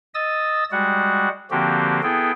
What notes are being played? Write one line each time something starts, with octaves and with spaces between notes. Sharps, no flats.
D#5 D#6 E6 A6
G3 G#3 F#4 F#5
D3 F3 A#3 C4 F#4 G4
B3 E4 G#4 A4 G5